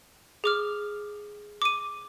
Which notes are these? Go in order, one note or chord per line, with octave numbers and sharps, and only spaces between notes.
G#4 D6 F6
D6 D#7